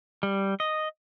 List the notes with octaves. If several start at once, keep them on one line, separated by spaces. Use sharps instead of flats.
G3
D#5